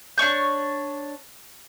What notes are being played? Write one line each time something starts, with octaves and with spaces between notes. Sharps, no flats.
D4 C#5 C#6 G6